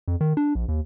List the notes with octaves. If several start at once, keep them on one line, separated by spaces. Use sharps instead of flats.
F2
D#3
D4
A#1
D#2